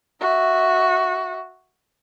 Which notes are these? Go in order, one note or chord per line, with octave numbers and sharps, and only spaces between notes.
F#4 E5